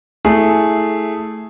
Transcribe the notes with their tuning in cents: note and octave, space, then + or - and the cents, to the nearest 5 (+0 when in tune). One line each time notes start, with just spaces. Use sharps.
A3 +0 E4 -15 G#4 +0